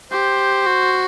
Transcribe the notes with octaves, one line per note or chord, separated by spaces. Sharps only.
G4 C5
F#4